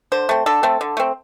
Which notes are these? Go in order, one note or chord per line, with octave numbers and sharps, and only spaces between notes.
D3 C5
A3 C4
D3 A4
A3 C4
D3
A3 C4